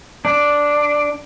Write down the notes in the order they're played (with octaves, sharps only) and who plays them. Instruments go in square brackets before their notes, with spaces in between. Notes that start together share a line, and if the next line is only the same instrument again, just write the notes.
[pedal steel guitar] D4